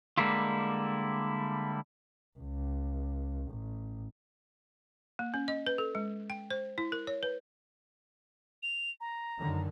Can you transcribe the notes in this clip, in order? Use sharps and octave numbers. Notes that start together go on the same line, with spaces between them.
D3 G3 G#3 A#3 E4 F4
C#2
A1
A#3
C#4
D#5
B4
A4
G#3
G5
C5
E4
A#4
C#5
B4
F7
A#5
F#2 D3 D#3